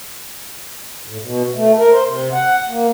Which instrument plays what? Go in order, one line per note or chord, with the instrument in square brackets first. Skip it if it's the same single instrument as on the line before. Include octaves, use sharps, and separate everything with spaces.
[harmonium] A2
B2
A3
A#4
C5
C3
F#5
A#3